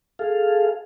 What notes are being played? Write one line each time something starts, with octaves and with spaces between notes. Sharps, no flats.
G#4 A4 F5